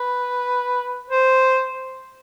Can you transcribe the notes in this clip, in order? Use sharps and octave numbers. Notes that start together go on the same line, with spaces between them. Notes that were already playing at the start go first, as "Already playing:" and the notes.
Already playing: B4
C5